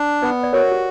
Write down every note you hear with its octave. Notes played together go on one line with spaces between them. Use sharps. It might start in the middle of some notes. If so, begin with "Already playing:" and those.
Already playing: D4
B3 B4 D5
D5
F#4 A#4 C#5
G4